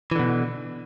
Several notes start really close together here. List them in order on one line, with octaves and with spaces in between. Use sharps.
E3 D3 B2